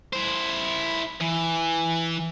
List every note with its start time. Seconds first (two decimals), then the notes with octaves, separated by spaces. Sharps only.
0.13 E4 C5
1.21 E3